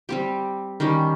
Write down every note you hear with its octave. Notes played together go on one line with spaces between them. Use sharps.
G3 C4 G4
D#3 G3 C#4 G4